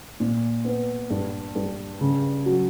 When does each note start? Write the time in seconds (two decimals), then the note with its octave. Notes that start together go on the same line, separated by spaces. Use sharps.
0.20 A#2
0.65 B3
1.10 G2
1.55 G2
2.01 C#3
2.46 F#3